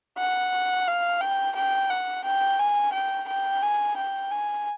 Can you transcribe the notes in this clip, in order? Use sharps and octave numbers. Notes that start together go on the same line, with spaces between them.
F#5
F5
G5
G5
F#5
G5
G#5
G5
G5
G#5
G5
G#5